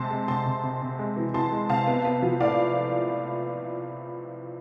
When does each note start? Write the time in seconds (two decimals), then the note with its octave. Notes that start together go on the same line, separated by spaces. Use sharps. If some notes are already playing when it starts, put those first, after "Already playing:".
Already playing: C3 G#3 A5 C6
0.10 G#3
0.28 C3 A5 C6
0.46 C3
0.63 C3
0.82 C3
0.99 G#3
1.16 E3
1.34 E3 A5 C6
1.52 G#3
1.69 C3 F5 A5
1.87 B3
2.05 B3
2.22 F3
2.40 A2 D5 F5